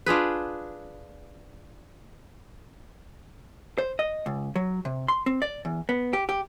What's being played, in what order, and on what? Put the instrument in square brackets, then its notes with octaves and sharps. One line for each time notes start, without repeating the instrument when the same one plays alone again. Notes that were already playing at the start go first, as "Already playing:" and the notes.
[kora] D4 F4 G#4 B4
[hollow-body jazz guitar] C5
D#5
C#2
F#3
C3
C6
C4
D5
E2
B3
G4
G4